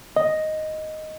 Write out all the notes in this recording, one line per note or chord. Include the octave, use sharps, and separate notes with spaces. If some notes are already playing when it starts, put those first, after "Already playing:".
D#5